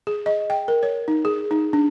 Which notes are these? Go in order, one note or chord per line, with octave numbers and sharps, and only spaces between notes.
G#4
D#5
G5
A#4
C#5
D#4
G#4
D#4
D4